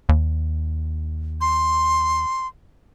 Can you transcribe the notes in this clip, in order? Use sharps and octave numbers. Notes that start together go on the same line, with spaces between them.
D#2
C6